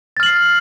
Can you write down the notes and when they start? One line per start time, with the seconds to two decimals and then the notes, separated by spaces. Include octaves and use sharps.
0.17 A6
0.20 F6
0.23 F#7
0.26 C7